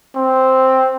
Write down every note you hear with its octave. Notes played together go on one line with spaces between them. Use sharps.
C4